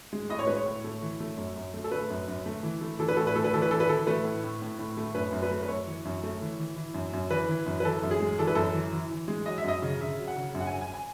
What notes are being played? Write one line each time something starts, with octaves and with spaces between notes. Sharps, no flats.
G#3
A2 D#5
C#5
G#3 B4
C#5
A2
A3
E3
A3
F#2
F#2
A3
A4
A3 B4
F#2
F#2
A3
E3
A3
E3 A4
B4
A2 A4
B4
A3 A4
B4
E3 A4
B4
E3 A4
B4
E3 A4
A3 B4
A2
A2
A2
A2
A3
F#2 B4
F#2
B4
A3
B4
F#2 C#5
E3
F#2
A3
E3
E3
E3
F#2
F#2
E3 B4
E3
F#2
B4
E3 A4
F#2
G#4
G#3
E3 A4
B4
F#2 A4
E3
E3
E3
G#3
F#3 D#5
E5
F#2 D#5
C#3
C#3 E5
F#3
F#5
C#3
F#2
F#5
F#2 G#5
G#5
G#5